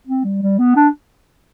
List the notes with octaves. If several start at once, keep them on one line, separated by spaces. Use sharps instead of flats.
C4
G3
G3
B3
D4